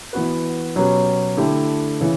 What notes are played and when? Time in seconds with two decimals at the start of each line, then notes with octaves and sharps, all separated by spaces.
0.13 E3 B3 F#4 B4
0.75 B2 F#3 C#4 G4 B4
1.37 D3 A3 E4 G4
2.01 C#3 E3